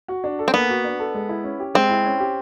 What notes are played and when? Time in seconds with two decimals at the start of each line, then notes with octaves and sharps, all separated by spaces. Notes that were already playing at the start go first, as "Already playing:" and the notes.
0.08 F#4
0.24 D4
0.39 A4
0.48 C4
0.54 A#3 B3
0.69 F#4
0.84 D4
0.99 A4
1.15 G#3
1.29 E4
1.44 C#4
1.60 G4
1.75 G#3 C4
1.90 E4
2.05 C#4
2.20 G4